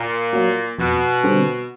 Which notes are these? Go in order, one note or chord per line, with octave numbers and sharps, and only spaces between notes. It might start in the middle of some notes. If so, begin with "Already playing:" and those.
Already playing: A#2
F#3 A#3
F2 B2
D3 G3 C4